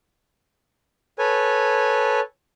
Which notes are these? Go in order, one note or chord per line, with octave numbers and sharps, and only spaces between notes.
A4 B4 C#5 G#5